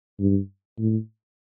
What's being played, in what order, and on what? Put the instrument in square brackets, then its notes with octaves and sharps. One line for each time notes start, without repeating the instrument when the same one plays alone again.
[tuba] G2
A2